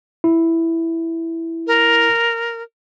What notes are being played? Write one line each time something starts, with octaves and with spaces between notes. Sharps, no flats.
E4
A#4